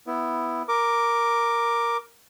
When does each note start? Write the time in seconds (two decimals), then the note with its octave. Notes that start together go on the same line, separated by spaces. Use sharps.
0.07 B3 E4
0.68 A#4 D6